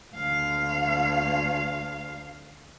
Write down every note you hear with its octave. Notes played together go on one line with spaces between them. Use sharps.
D2 F5